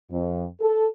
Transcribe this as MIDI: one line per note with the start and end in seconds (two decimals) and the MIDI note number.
0.11 0.45 41
0.61 0.87 69